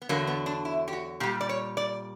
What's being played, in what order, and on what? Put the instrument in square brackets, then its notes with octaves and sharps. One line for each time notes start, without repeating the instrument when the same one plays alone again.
[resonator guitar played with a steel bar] B3
E2 D3 F#3 A#3
B3
D4
E4
G4
F#4
A#2 G3 G4
D5
C#5
D5